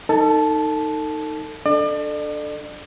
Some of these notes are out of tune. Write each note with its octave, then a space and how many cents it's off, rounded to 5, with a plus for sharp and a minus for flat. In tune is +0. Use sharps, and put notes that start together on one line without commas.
D#4 +0 A4 +30 A5 -15
D4 +0 A4 +0 D5 +40